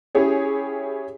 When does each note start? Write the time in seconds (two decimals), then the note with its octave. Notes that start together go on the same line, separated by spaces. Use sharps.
0.15 C#4 E4 G4 G#4 C#5